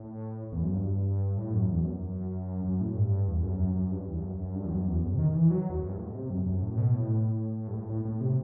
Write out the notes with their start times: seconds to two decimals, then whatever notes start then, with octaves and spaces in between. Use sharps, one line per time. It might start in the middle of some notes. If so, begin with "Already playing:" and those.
Already playing: A2
0.52 E2
0.63 F#2
0.74 G2
1.37 A2
1.53 F#2
1.69 E2
1.85 F#2
2.64 F#2
2.81 A2
2.96 G2
3.28 E2
3.44 F#2
3.60 F#2
3.75 F#2
3.92 G2
4.07 E2
4.19 G2
4.23 F#2
4.40 F#2
4.55 G2
4.65 E2
4.71 F#2
4.87 E2
5.03 F#2
5.15 C3
5.19 D#3
5.35 E3
5.51 F#3
5.69 E2
5.79 F#2
5.88 G2
5.98 A2
6.08 B2
6.14 C3
6.30 F#2
6.46 F#2
6.62 A2
6.78 B2
6.94 A2
7.68 G2
7.73 A2
7.89 A2
8.05 A2
8.21 C3